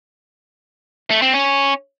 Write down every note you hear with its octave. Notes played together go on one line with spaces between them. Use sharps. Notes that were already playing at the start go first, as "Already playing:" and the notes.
A3
C4
C#4